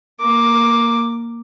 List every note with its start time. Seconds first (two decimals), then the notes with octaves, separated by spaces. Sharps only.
0.21 A#3 D6